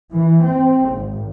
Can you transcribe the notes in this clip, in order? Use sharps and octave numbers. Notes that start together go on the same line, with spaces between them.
E3
C4
G#1